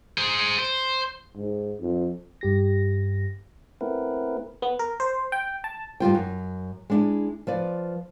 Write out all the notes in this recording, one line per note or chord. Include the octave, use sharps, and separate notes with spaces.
G#4 C5
C5
G#2
F2
G2 G4 A#6
A3 B3 C4 E4 A#4 B4
B3
A#4
C5
G5
A5
G2 G3 F4 G5
F#2
G#3 D4 E4
F3 B4 D5